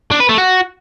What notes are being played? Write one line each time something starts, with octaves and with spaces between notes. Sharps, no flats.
D4
B4
A3
F#4